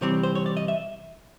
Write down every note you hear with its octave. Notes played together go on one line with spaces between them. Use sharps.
C3 E3 G3 C4 C#5
C5
C#5
D5
D#5
E5